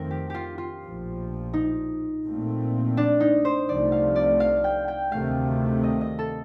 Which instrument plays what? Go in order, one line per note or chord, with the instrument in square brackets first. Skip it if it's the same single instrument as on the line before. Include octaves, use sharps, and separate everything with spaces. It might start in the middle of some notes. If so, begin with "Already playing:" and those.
Already playing: [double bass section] F2 D#3 A3 C4 [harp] A#4
[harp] G4
F4 G4
F4
[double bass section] A#1 A2 F3
[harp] D#4
[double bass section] A#1 A#2 A3 C4
[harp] D4
D#4
C5
[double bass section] C2 C3 F3 A3 [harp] D5
[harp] F5
D5
F5
G5
G5
[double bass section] D2 C3 D#3 A3 [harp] F5
[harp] D#5
D#5
A4